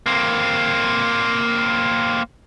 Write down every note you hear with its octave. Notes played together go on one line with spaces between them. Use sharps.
A#3 C4